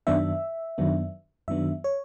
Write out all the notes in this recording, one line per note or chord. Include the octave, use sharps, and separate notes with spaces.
F#2 D#3 F#3 B3 D4 E5
F#2 D#3 F#3 B3 D4
F#2 D#3 F#3 B3 D4 E5
C#5